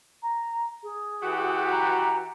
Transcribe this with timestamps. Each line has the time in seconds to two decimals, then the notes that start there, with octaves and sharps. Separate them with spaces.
0.23 A#5
0.83 G#4
1.23 E3 F#4 G4
1.71 A#5